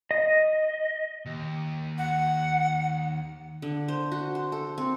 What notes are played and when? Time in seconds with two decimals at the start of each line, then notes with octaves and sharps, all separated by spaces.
0.11 D#5
1.26 D#2
1.98 F#5
3.62 D3
3.88 C5
4.12 F#4
4.35 C5
4.52 A4
4.78 C4